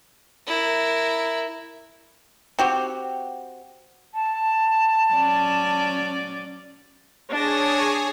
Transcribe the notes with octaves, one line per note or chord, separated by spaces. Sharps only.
E4 A#4
C4 F#4 G4
A5
F#3 C#4 D5
D4 G#4 C#5 G#5 A5 A#6